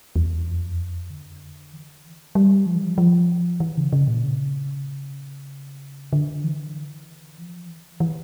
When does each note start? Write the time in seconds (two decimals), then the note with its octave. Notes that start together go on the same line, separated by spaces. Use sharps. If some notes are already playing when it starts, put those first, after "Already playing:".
0.16 E2
0.47 F2
1.10 D3
1.73 E3
2.35 G3
2.66 F3
2.76 E3
2.83 F3
2.98 F3
3.60 E3
3.77 C#3
3.93 C#3
4.08 A#2
4.24 C#3
6.13 D3
6.44 E3
7.38 F3
7.68 E3
8.00 E3